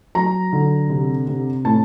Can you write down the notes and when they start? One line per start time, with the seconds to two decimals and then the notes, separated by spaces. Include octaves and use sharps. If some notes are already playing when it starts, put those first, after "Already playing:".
0.15 F#3 A#5
0.53 D3
0.90 C3
1.28 C3
1.65 A2 A5